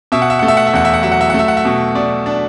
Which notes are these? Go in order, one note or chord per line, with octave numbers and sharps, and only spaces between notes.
B2 E5
F#5
E5
A3 F#5
E5
F#5
E5
E2 F#5
E5
F#5
F#3 E5
F#5
E5
F#5
A3 E5
F#5
E5
B2
B2 D5
D4